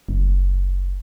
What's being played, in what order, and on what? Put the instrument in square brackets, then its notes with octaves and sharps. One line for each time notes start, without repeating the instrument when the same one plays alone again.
[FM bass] F#1